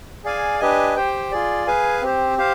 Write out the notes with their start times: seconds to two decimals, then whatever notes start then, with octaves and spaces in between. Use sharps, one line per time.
0.24 G#4 D5 F5 G#5
0.59 D4 G4 B4 D#5 G#5
0.96 G4 C5 G5
1.32 F4 G#4 D5
1.67 G#4 B4 F5 G#5
2.02 C4 G4 C5
2.37 G4 C5 F5